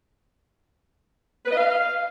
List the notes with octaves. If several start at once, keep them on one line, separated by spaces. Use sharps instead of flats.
B4
D#5
F5